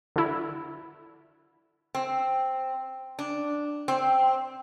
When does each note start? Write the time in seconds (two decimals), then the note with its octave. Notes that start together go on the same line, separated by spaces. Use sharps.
0.16 D3 E4
1.95 C4
3.19 D4
3.88 C4